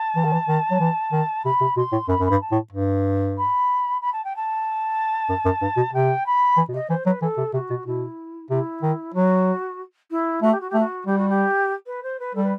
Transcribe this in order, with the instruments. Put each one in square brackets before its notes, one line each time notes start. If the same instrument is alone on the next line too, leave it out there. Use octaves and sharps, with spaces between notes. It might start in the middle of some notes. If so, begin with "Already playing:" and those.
Already playing: [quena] A5
[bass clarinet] E3
D#3
E3
D#3
F#3
E3
D#3
[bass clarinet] C3 [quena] B5
[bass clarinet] C3
[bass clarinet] B2 [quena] C6
[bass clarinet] A2
[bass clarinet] F#2 [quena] B5
[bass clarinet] F#2
[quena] B5
[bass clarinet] G2
[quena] A5
[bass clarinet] A2
G2
[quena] B5
B5
A5
G5
A5
[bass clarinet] F#2
F#2
G2
B2
[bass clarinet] C3 [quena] G5
[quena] B5
[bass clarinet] E3
B2
[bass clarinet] C3 [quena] D#5
[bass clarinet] E3 [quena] C5
[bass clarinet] F#3 [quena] B4
[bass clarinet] E3 [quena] A4
[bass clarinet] C3
[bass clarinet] C3 [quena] F#4
[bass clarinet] B2
[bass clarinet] B2 [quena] E4
[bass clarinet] C3 [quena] E4
[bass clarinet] D#3
[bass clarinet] F#3 [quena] F#4
[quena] E4
[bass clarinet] A3 [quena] F#4
[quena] G4
F#4
G4
[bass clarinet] A3
[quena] F#4
[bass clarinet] G3 [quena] G4
[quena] F#4
G4
B4
C5
B4
[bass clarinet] G3 [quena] A4
[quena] B4